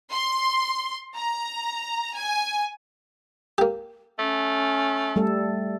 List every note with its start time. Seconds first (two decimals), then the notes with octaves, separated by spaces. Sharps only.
0.13 C6
1.17 A#5
2.18 G#5
3.58 A#3 G4
4.19 A3 C#4
5.16 G3 A3 A4